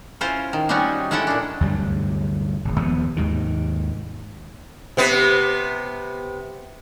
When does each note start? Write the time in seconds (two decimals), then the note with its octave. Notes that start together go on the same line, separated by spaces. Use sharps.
0.21 C#4 E4 F4 C5
0.53 D#3
0.69 G3 C4 C#4 D#4 F4 F#4
1.11 G#3 C#4 E4 A4 F#5 G5
1.27 A#2 D4
1.61 D2 G2 C3 F#3
2.65 D1 G#1
2.80 D#2 F3 B3
3.17 D#2 G#2 C3 D#3
4.97 C3 B3 B4